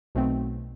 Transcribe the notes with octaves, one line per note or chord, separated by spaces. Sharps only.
B1 B2 A3 C4